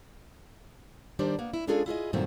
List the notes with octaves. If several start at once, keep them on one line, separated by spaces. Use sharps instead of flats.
D#3 G3 D4 C5 D5
A#3 B3
E4
G#3 C#4 D4 F4 G#4 A4
E4 F4 G#4 D#5
G2 A#2 D#3 F#3 A3 C4